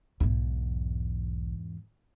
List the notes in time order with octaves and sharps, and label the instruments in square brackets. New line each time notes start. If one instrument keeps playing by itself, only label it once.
[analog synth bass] B1 [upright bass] E2 G#2